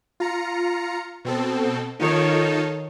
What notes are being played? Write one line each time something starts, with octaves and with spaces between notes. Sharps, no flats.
F4 A#5 C#7
B2 C4 A4
D#3 D#4 F4 A4 C#5